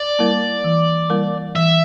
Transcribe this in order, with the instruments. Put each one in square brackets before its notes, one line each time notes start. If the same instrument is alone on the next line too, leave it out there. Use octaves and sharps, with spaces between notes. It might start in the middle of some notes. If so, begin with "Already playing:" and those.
Already playing: [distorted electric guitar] D5
[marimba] G3 A#3 E4 A#4
E3
G3 A#3 E4 A#4
[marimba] E3 [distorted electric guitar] E5